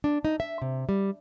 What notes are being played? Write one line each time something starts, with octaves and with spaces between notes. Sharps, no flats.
D4
D#4
E5
C3
G3